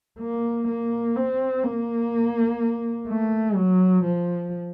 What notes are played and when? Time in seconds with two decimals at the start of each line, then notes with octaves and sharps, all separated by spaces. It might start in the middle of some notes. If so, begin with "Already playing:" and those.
0.20 A#3
0.68 A#3
1.16 C4
1.64 A#3
3.09 A3
3.56 F#3
4.04 F3